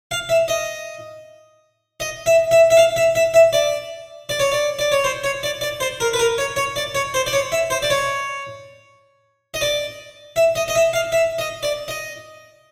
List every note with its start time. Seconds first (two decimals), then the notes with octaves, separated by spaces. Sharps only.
0.11 F5
0.29 E5
0.48 D#5
2.00 D#5
2.26 E5
2.51 E5
2.70 E5
2.77 F5
2.96 E5
3.15 E5
3.34 E5
3.53 D5
4.29 D5
4.39 C#5
4.52 D5
4.79 D5
4.92 C#5
5.04 C5
5.24 C#5
5.43 D5
5.61 D5
5.80 C5
6.00 A#4
6.13 B4
6.19 A#4
6.38 C#5
6.56 C#5
6.76 D5
6.95 C#5
7.14 C5
7.26 D5
7.33 C#5
7.52 E5
7.70 C5
7.82 D5
7.90 C#5
9.54 D#5
9.61 D5
10.36 E5
10.55 D#5
10.68 D#5
10.75 E5
10.93 F5
11.12 E5
11.39 D#5
11.63 D5
11.88 D#5